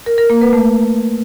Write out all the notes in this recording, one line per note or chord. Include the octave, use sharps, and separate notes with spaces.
A#4
A#4
A#3
B4
A3